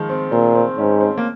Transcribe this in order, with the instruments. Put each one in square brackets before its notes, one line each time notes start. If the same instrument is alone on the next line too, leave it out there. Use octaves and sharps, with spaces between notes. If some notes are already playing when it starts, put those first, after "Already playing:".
Already playing: [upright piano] D#3 F3 G#3
C4
[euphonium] A#2 [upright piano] C4
[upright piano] C4
[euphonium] G#2 [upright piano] C#4
[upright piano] C4
A#3